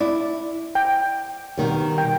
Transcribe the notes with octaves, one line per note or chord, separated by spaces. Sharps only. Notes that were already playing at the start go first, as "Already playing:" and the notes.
E4 D5
G5
B2 D#3 G3
G5